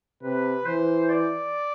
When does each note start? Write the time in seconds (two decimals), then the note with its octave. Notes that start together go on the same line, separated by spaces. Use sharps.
0.23 C3 B4
0.66 E3 C5
1.09 D5